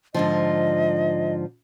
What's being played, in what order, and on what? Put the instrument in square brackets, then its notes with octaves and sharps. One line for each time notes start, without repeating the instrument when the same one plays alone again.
[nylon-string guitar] G#2 D3 F3 [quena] D#5